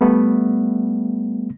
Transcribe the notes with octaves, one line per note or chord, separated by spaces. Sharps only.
G3 A3 B3